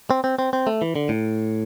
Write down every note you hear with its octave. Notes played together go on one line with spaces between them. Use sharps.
C4
C4
C4
C4
A3
E3
D3
A2